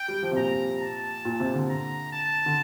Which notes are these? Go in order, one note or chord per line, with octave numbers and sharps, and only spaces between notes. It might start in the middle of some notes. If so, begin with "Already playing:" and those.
Already playing: G5
G3
F3
C3
A#2 A#5
A5
A#2
C3
D3
A#5
A5
D3